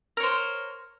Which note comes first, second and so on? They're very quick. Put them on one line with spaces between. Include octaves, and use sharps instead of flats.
A#4 C#5 C5